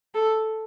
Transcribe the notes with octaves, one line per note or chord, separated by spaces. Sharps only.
A4